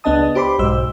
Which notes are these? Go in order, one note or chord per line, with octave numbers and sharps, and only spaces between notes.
C#2 B3 D4 D#5 A5 D#6
G4 C5 B5 C6 D6
B1 G#2 C5 E6